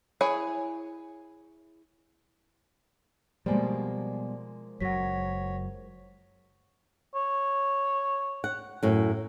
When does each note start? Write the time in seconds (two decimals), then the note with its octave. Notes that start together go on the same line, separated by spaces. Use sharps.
0.21 E4 G#4 C#5 G#5
3.46 B2 F3 G3 G#3 A#3 D5 G#5
4.81 F#1 F#2 F#3 C#5 F#5 A#6 B6
7.15 C#5
8.44 F#5
8.83 F#2 A2